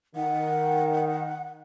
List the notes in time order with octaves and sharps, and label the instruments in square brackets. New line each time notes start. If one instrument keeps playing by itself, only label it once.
[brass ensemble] D#3 [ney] F#5